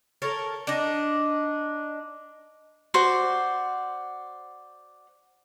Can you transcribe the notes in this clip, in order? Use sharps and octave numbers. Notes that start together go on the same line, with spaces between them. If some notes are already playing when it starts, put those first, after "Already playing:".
A4 A#4 C#5
D4 D#4
F#4 C5 D5